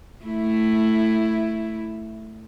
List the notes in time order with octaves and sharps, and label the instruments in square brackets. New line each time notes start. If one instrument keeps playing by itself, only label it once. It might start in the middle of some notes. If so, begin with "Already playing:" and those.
[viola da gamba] A3 E4